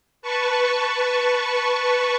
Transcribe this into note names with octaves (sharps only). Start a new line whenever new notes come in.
B4 A5 C#6